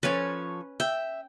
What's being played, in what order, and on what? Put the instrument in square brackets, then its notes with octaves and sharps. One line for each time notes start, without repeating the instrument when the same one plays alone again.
[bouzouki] F3 A4 C#5 [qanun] C#4 B4
[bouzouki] E5 [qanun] G5